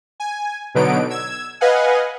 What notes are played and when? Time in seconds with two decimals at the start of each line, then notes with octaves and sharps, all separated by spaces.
0.20 G#5
0.75 B2 D3 F#3 B3 D#4 D7
1.10 E6 G#6
1.61 B4 D#5 F5 F#5 G#5